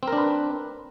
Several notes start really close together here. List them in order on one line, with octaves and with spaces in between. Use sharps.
C4 A#4 D4 B4